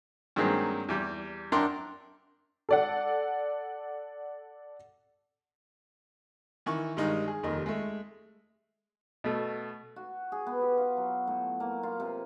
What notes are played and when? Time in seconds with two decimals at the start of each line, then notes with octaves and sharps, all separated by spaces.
0.36 G2 D#3 F#3 G#3 A#3 C4
0.89 E2 G3 G4
1.52 F#2 D4 A#4 G5 C6
2.69 A4 D5 F#5
6.66 D#3 E3 C#6
6.97 G2 D#3 G3 G#3 D#4
7.28 G#4
7.43 F1 D#2 D#3 G3 D#5
7.66 G#3 A3
9.24 B2 A3
9.96 F#4
10.32 G#4
10.46 B3
10.61 G4
10.78 F4
10.97 F#3
11.27 A2
11.60 A#3
11.83 F4
12.00 C3